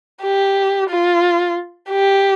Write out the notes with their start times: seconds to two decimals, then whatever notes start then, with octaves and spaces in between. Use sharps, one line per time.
0.23 G4
0.90 F4
1.90 G4